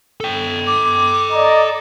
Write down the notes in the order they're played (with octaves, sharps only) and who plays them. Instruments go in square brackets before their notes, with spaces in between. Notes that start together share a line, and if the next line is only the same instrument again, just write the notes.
[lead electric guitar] A4 G5
[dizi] D6
[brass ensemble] D5 D#5 A#5